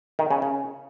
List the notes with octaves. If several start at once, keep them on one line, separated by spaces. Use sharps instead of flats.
D#3
C#3
C#3